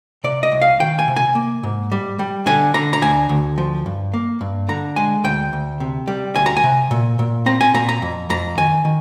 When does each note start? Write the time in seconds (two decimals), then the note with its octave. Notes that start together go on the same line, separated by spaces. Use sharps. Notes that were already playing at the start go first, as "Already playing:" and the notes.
0.24 C3 D5
0.43 D#5
0.52 C2
0.62 F5
0.80 D#3 G5
0.99 G#5
1.08 C3
1.16 G#5
1.35 A#3
1.63 G#2
1.92 G3
2.19 G3
2.46 D3 G#5
2.74 D3 A#5
2.93 A#5
3.02 D2 G#5
3.29 D2
3.58 F3
3.86 G2
4.14 A#3
4.41 G2
4.69 D3 A#5
4.96 G#3 G#5
5.24 D2 G5
5.53 D2
5.80 C3
6.08 G3
6.35 D2 G#5
6.46 A#5
6.57 G#5
6.63 C3
6.91 A#2
7.19 A#2
7.46 C4 A#5
7.61 G#5
7.74 A#2 A#5
7.89 A#5
8.02 F2
8.30 F2 A#5
8.58 D#3 G#5
8.85 D#3